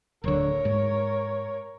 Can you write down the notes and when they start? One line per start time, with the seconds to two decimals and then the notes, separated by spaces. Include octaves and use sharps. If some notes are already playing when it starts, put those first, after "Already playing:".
0.24 D1 D3 A#4 C#5
0.65 G#2